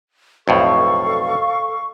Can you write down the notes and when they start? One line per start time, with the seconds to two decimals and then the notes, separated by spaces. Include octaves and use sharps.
0.48 B1 F2 A2 A4 F5 C#6